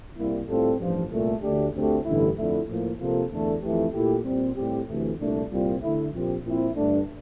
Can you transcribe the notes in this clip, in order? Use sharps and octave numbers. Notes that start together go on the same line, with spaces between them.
C2 C3 G3 A#3 E4
A2 G3 C4 F4 A4
A1 G2 F3
C2 A#2 A3
D2 D3 A3 D4 G4
D2 D3 A3 C4 G4
A1 G2 D3 A3 E4
F2 D3 A3 E4
A2 F3 A#3
C3 F3 A#3 F4 A4
E2 D3 A3 D4 A4
F2 E3 A3 E4 G4
A#2 A3 E4 G4
A#2 G3 C4
A2 G3 C4 G4
D2 C3 E3 A3
C2 A#2 A3 D4
C2 A#2 G3 C4 F4
D3 A3 E4
A#1 A#2 F3 C4 G4
A#2 F3 C4 E4
G2 D3 A3 D4